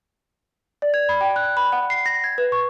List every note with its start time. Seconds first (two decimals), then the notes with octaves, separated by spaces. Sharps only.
0.82 D5
0.94 G#6
1.09 B5
1.21 G5
1.36 F#6
1.57 B5
1.72 F#5
1.90 C7
2.06 A#6
2.24 G#6
2.38 B4
2.52 C#6